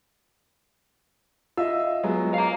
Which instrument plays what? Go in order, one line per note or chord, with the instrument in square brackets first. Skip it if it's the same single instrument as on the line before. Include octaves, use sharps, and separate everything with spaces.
[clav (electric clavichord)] F4 [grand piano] D#5 E5 E6
[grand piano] F#3 G#3 B3
[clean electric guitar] F5 A#5